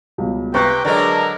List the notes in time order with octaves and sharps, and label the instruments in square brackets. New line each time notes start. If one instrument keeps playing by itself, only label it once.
[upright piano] C#2 B2 G3
[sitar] C3 [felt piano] B4 C#6 F#6 [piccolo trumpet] G5
[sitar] D3 F#3 G#3 [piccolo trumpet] A#4 [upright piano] D5